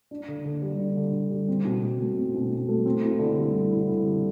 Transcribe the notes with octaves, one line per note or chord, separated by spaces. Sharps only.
D4
D3
D3
G3
D4
D3
D3
G3
C4
B2
B2
A3
C4
B2
B2
A3
C4
E4
D3
G3
C4
E4
D3
G3